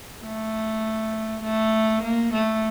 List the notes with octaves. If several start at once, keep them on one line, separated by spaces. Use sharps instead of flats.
A3
A3
A#3
A3